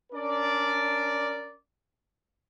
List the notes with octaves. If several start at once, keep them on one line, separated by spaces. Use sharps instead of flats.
C#4 D4 A#4 D5